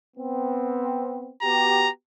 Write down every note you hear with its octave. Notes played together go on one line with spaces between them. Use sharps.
B3 C4
B3 F#4 G4 A#5